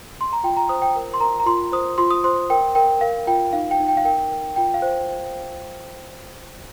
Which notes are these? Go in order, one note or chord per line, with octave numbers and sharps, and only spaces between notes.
C6
A#5
F4 G5
A#5
C5 D#6
G5
A#4
C6
A#4 A#5
A#5
F4 C6
C5 D#6
F4 C6
D#6
C5 C6
A#4 G5
A#4 G5
A#4 F5
F4 G5
D#4 F5
G5
D#4
G5
F5
A#4 G5
A#4
F4 G5
F5
C5